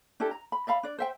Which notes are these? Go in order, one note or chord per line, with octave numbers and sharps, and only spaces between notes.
D4 E4 G4 A4
A#5
B5
D5 E5 F5 B5
D4 D5
C5 E5 G5